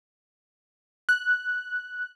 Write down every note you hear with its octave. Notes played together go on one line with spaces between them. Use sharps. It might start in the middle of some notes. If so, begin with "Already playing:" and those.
F#6